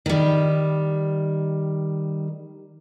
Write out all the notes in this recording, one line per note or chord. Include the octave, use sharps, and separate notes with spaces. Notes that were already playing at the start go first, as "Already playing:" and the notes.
D#3 G3